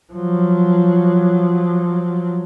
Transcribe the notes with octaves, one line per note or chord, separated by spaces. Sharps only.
F3 F#3